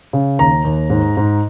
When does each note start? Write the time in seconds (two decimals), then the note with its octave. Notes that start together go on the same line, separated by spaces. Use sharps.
0.13 C#3
0.39 D#2 A#5
0.65 D#2
0.90 G#2
1.17 G#2